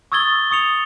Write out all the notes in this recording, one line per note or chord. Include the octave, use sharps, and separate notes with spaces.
C#6 D#6 E6 G#6 A6 G7
C#6 D#6 C#7 F7